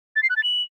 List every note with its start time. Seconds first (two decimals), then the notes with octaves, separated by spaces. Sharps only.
0.16 A6
0.23 C7
0.30 F#6
0.37 A6
0.44 F#7